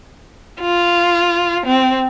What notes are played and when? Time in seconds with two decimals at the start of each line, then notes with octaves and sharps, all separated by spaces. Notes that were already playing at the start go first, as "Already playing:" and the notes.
0.61 F4
1.66 C4